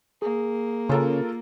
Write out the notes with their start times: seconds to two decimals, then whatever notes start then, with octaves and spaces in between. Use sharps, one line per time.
0.22 A#3 G#4
0.89 C#3 F4 A4 A#4